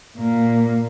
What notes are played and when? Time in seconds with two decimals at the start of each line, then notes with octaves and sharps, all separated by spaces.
0.18 A#2 A#3